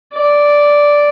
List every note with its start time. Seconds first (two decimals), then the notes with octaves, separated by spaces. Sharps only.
0.14 D5